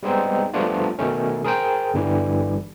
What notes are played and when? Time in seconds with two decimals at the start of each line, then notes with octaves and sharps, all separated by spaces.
0.03 G3 G#3 B3 C4 D#4
0.54 F3 G3 A3 B3 D4 F4
0.99 B2 D#3 A3 C#4
1.44 G#4 A#4 C5 G5
1.94 G1 D3 E3 G3